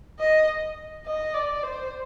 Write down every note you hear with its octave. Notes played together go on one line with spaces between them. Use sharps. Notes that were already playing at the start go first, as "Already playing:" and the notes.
D#5
D#5
D5
C5